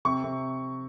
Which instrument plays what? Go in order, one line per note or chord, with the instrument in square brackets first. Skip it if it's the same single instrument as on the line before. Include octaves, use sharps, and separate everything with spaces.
[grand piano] C3 C#6
C3